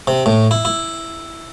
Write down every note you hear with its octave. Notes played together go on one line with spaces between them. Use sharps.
C3
A2
E4
E4